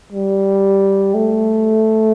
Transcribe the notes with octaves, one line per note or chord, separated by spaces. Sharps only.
G3
A3